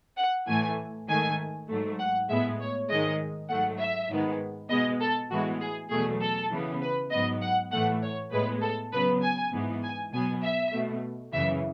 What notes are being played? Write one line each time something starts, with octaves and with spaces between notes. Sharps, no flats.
F#5
A2 E3 A3 G#5
G#2 D#3 A3 G#5
G#2 F#3 A3
F#5
A2 G#3 B3 E5
C#5
G#2 D#3 G#3 D#5
G#2 F#3 A3 F#5
E5
G#2 D#3 G#3 B3
B2 G#3 B3 D#5
A4
A2 E3 G#3 B3 F#4
G#4
E2 B2 F#3 A3 G#4
A4
C#3 E3 B3
B4
G#2 F#3 B3 D#5
F#5
A2 E3 A3 F#5
C#5
A2 G#3 B3 B4
A4
C#3 F#3 B3 B4
G#5
G#2 E3 B3
G#5
B2 F#3 B3 G#5
E5
B2 A3
F#2 C#3 E3 E5